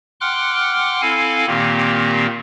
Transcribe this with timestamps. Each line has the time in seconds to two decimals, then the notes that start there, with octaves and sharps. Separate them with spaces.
0.21 F#5 G5 C6 D6 F6 F#6
1.01 C4 E4 A4 F5 G#5
1.47 A#2 D#3 A#3 C4 G4